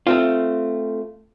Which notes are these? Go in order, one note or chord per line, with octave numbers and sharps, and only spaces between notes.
A3 C4 F4